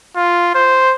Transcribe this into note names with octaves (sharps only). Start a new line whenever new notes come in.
F4
C5